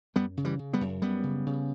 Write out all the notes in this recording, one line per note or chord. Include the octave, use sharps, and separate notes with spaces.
F#2 G3 B3
C#3
E3 G3
C#3
G3 B3
F#2
F#2 G3 B3
C#3
C#3